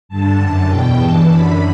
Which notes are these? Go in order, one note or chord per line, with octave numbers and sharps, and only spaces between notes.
G2 D3 A5
F#2 D3
E2 B2 G5
G2 E3 A5
F#2 D3 B5